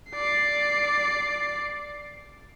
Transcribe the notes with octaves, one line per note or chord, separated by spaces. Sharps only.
D5 C7